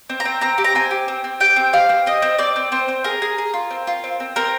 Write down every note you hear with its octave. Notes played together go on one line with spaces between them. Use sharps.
C4
A#5
C4
C4 A#5
G4
A#5
C4 G#5
G4
C4
C4
G4 G5
C4
G4 F5
C4
C4 D#5
C4
C4 D5
C4
C4 C5
C4
G#4 A#4
G#4
G#4
F4
C4
F4
C4
C4
C4 A#4